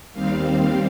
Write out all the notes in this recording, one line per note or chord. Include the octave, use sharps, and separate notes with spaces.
D#2 D#3 G3 C4 F5